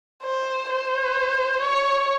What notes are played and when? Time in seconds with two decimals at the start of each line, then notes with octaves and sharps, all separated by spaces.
0.23 C5
0.69 C5
1.61 C#5